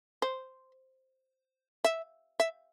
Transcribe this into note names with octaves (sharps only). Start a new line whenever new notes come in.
C5
E5
E5